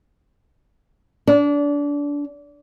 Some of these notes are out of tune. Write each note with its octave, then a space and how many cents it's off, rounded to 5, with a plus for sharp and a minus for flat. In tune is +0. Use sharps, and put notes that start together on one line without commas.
D4 -25